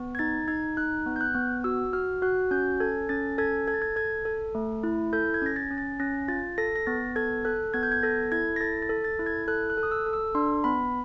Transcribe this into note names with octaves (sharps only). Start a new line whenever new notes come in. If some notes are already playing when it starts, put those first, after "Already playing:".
Already playing: B3
G#6
D#4 A6
D#4 G#6
D#4 F#6
B3
G6
F#6
B3
F#4 E6
F#4 F6
F#4 F#6
C#4 G6
A4 G#6
C#4 A6
A4 G#6
A4 G#6
A6
G#6
A4 G#6
A4
A3
E4
A4 G6
G#6
C#4 A#6
A6
C#4
A6
C#4 A#6
F4 A6
A4 A#6
A#6
B3 A6
A4 G#6
A4 F#6
B3 G#6
G6
G#6
A4 A#6
E4 G#6
A#6
A4 A6
A6
A4
A6
E4
G#6
A4 F#6
F#6
A4
D#6
E6
A4
E6
D4 C6
B3 B5